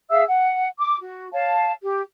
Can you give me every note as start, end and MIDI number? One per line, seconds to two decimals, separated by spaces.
0.10 0.23 68
0.10 0.23 76
0.10 0.23 77
0.10 0.23 88
0.29 0.67 78
0.79 0.97 86
0.98 1.29 66
1.33 1.71 73
1.33 1.71 77
1.33 1.71 81
1.83 2.01 67